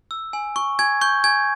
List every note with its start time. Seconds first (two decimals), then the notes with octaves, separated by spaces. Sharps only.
0.11 E6
0.33 G#5
0.56 C#6
0.79 G#5 G#6
1.01 C#6 G6
1.24 G#5 G#6